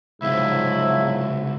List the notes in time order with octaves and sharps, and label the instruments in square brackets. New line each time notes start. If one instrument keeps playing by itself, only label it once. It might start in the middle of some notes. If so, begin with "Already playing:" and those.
[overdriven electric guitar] C#2 C3 [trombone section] G#2 F3 F#3 [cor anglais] E4